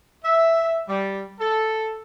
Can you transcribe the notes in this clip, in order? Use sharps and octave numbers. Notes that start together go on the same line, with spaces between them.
E5
G3
A4